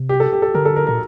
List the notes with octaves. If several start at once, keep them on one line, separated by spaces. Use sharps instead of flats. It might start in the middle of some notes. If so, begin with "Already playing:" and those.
Already playing: C3
G4
A4
G4
A4
D3 A#4
A4
A#4
A#2 A#4